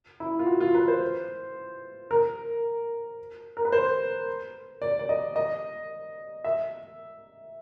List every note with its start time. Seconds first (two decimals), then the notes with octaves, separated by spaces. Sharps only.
0.20 E4
0.39 F4
0.47 F#4
0.60 F4
0.75 B4
0.88 C5
2.11 A#4
3.57 A#4
3.65 B4
3.72 C5
4.82 D5
4.99 D5
5.09 D#5
5.36 D#5
6.44 E5